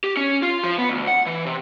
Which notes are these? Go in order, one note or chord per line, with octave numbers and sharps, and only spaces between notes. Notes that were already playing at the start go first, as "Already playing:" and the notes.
G4
C#4
F4
F3
B3
D2
F#5
E3
C3